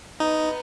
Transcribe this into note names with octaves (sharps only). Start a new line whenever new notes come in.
B3 D#4